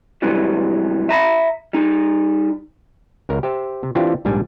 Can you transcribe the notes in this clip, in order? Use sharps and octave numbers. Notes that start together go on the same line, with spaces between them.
G#2 C3 E3 F#3 G3
E5 A#5 B5
G3 D#4
C#2 C#3 A#4
G4 C5 E5
C3
E3 C4 D4 E4 F4 G4
A#1 G#2 G3 D4 G5 G#5